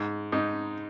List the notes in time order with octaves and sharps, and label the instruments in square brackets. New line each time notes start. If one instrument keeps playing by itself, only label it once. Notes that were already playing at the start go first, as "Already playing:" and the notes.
Already playing: [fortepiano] G#2
G#2 D#4